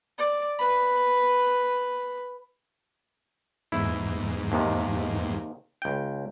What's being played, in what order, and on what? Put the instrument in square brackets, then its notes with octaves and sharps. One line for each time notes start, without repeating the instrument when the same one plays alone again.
[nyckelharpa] D5
B4 B5
[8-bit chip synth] E2 G#2 [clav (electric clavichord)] E4
[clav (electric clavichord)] D#2 C3 D#3
C#2 G5